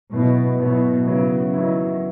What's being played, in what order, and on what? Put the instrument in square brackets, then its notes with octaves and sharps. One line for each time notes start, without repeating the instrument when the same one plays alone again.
[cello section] B2 [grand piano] F#3 B3 E4
[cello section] B2 [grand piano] F#3 B3 E4
[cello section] C#3 [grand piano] F#3 B3 E4
[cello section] D#3 [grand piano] F#3 B3 E4